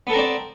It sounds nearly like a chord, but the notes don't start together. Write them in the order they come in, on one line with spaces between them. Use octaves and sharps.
B3 A4 A#4 C4 D5